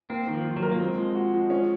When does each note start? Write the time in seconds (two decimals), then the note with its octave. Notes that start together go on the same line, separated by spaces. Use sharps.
0.10 A#3 C4
0.27 D#3
0.33 F3
0.44 F4
0.56 F#3
0.62 A#4
0.71 A#3
0.80 G#3 C4
0.98 F3
1.15 F#4
1.34 F3
1.50 C#4